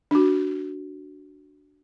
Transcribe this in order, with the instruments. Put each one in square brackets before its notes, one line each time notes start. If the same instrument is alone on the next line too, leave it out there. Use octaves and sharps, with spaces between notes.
[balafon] D4 F#4